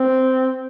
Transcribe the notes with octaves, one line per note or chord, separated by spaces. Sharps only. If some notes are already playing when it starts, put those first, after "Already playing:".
Already playing: C4